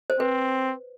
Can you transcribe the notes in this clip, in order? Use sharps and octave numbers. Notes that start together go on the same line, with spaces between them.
C5
C4 B4